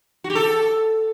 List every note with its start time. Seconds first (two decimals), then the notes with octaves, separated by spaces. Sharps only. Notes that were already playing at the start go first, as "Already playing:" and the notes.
0.24 F#4
0.30 G4
0.35 A4